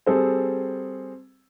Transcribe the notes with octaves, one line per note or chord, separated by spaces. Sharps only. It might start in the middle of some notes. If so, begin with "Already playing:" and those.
G3 C4 G#4 A4 C5